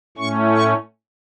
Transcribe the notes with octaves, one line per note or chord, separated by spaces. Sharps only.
A2 A3 C#4 C#6
C#6